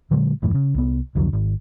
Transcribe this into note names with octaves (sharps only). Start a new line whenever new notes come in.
A#2 D3 F#3 G#3
D#1 F#2 A2 E3
C#3
C2 B3
C2 F2 D3 F#3
G#1